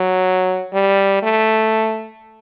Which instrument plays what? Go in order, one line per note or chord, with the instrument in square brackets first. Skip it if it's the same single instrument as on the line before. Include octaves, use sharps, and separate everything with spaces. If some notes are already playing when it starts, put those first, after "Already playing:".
Already playing: [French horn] F#3
G3
A3